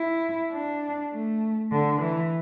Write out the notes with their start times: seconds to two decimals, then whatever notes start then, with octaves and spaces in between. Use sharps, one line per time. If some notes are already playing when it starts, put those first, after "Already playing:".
Already playing: E4
0.51 D4
1.12 A3
1.71 D3
2.01 E3